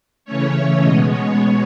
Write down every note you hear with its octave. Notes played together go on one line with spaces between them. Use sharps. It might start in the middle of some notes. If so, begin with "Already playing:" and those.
C#3 E3 A3 C#4 C#5
B2 G#3 B3 D#5
C#5